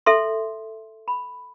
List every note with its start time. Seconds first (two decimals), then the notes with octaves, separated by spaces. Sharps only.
0.06 A4 E5 C6
1.08 B5